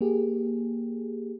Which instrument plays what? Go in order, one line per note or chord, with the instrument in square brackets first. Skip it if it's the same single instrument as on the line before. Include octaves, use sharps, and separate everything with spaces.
[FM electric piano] A#3 G4 G#4